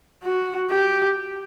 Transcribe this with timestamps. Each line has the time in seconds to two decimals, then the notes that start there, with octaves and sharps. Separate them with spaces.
0.23 F#4
0.71 G4